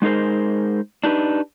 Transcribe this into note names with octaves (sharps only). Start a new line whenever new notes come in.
G#3 D#4 G#4 A#4 C5
D4 D#4 G4 B4